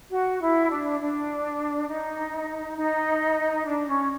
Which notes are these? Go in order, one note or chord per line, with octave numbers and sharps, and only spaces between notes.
F#4
E4
D4
D4
D#4
D#4
D4
C#4